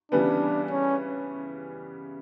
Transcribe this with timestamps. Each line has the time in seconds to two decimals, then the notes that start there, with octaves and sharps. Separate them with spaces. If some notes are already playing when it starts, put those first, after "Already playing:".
0.12 C#3 E3 G3 B3 D4
0.70 C#4